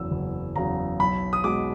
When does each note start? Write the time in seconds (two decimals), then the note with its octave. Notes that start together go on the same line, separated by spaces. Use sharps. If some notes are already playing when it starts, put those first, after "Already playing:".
Already playing: F#1 E2 C#3 F#3 E6
0.11 F#1
0.56 E2 C#3 F#3 A#5
0.99 B1 B5
1.33 D#6
1.44 B2 G#3 D6